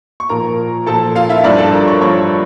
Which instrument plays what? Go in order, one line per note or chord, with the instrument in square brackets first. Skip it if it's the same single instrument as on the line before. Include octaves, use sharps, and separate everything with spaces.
[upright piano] C#6
A#2 F3 A#4 A#5
A#2 F3 A4 A5
F4 F5
E4 E5
G2 F3 D4 D5
A4 A5
A#4 A#5
C#5 C#6
G2 F3 C#5 C#6